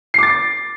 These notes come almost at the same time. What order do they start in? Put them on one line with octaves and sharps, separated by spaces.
C7 D6 A6